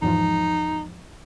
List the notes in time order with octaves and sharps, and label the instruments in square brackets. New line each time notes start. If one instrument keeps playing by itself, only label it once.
[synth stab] E2 G#2 F3 [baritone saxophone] D#4